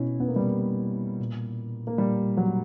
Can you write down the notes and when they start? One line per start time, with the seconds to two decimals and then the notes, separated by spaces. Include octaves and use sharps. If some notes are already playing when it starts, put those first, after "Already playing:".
Already playing: B2 C#4 E4
0.20 B3
0.28 A#3
0.36 G3
0.40 B2 A#3
1.19 A#2
1.87 A#3
1.98 A#2 G3
2.37 F#3